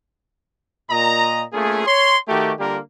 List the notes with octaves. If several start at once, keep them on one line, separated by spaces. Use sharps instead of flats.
A#2 D#5 A#5
A3 A#3 C#4 F4 G#4
C#5 C6
D#3 A3 D#4 F#4 G4
D3 G3 A#3 F4 G4 A#4